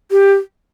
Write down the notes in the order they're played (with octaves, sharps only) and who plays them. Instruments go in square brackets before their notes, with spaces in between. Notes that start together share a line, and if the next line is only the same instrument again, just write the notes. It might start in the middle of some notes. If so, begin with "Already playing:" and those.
[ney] G4